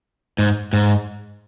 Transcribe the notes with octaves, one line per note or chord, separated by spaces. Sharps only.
G#2
G#2